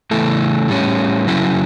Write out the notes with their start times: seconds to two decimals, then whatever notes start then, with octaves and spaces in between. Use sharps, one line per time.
0.11 C#3 E3 A3 E4 A4
0.68 A2 G3 C#4
1.26 F#2 C#3 F#3 C#4 E4